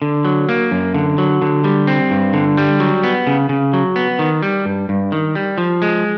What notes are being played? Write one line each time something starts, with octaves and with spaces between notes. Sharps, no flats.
D3
F#3
A#3
F#2
D3
F#3
D3
G3
C4
G2
D3
G3
F#3
B3
C#3
C#3
F#3
B3
D#3
G3
G2
G2
D#3
G3
F3
G#3